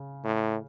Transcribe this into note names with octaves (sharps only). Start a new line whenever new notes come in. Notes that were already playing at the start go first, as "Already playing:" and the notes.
Already playing: C#3
A2